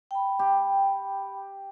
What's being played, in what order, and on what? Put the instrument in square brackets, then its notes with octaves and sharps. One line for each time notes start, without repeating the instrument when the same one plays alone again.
[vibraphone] G5 B5
[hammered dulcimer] G4